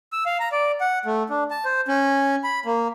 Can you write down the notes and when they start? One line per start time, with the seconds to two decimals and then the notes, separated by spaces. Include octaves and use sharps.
0.12 E6
0.26 F5
0.40 A#5
0.52 D5
0.81 F#5
1.05 A3
1.30 D4
1.51 A5
1.65 C5
1.88 C#4
2.44 B5
2.65 A#3